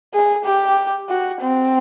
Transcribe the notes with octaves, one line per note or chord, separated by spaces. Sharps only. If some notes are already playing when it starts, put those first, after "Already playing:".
G#4
G4
F#4
C4